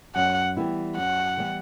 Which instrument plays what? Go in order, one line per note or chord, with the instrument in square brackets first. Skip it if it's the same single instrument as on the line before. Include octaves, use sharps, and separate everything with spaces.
[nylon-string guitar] F#2 [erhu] F#5
[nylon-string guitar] E3 G3 B3 E4
[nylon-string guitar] F#2 [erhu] F#5
[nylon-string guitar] E3 G3 B3 E4